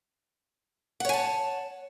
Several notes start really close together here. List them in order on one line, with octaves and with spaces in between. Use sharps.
F#5 C#5 G#5 A5